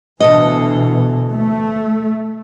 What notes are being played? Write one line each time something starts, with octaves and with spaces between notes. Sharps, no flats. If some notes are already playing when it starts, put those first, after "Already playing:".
D2 B2 E3 A4 D#5
A3